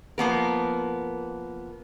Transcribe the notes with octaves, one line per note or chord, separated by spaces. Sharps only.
F3 A#3 B3 A#4